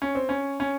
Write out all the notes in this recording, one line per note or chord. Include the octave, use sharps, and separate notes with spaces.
C#4
C4
C#4
C#4